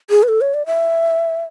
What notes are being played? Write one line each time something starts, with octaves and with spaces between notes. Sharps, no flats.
G#4
B4
A4
C#5
D5
E5